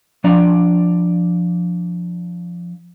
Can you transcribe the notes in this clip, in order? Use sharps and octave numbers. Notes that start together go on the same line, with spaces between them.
F3 D4 D5 A#5